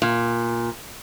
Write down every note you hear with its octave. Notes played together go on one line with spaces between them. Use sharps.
A#2